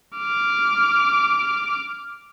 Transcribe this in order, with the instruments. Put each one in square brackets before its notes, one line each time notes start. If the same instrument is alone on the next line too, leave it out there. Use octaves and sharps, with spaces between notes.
[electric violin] D6 F6